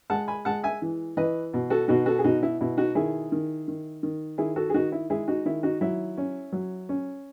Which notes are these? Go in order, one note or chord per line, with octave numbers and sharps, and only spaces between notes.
G#3 F#5 A5
G#5 B5
G#3 F#5 A5
E5 G#5
E3
E3 B4 D#5
B2
F#4 A4
B2 D#4 F#4
F#4 A4
G#4
B2 D#4 F#4
E4
B2 E4
D#4 F#4
D#3 E4 G#4
D#3
D#3
D#3
D#3 E4 G#4
F#4 A4
G#4
D#3 D#4 F#4
E4
G#3 E4 G#4
D#4 F#4
D#3 E4
D#4 F#4
F#3 E4
C#4
F#3
C#4